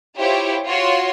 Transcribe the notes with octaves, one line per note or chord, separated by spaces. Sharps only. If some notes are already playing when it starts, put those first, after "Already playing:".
E4 F4 G4 C5 C#5
F4 F#4 C#5 C6